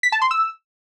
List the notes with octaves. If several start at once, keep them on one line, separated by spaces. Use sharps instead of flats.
B6
A5
C6
E6